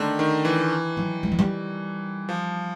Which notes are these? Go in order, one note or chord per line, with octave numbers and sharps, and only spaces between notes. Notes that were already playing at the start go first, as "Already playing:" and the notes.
Already playing: D3 D#3 A3
D#3
E3
F#3
G3
F#3
G3
F3